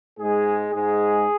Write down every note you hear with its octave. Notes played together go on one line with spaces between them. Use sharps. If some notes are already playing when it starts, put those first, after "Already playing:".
G#2 G#3 G#4
G#2 G#3 G#4